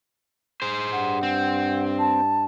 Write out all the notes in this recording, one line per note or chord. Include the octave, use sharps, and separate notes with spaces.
G#4 C5
G2 F#5
C4
A5